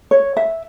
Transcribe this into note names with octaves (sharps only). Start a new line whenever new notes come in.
C#5
E5